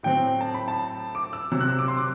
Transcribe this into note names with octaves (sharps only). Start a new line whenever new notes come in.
A2 F#3 C4 G5
A5
B5
A5
D6
E6
C3 F#3 C4 E6
F#6
E6
D6
C6
D6